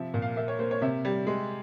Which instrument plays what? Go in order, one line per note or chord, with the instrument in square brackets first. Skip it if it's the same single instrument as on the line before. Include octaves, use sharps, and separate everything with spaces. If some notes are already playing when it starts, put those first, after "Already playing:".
Already playing: [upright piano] C3 F3 E5
A#2
F5
A#3 E5
C#5
A#3 C5
C#5
C3 E5
G3
G#3